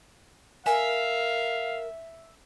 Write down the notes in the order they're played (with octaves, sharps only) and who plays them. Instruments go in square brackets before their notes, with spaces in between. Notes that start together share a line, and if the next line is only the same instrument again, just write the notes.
[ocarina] A#4 [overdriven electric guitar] E5 [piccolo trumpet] F5 [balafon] G#5